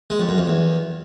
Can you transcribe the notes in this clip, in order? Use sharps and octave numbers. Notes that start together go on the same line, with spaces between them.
G#3
F2
F#2
F2
E2